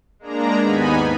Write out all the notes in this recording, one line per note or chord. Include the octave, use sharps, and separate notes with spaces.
G#3 A#3 D4 A#5
D#2 G#2 B3 D#4 G#5 B5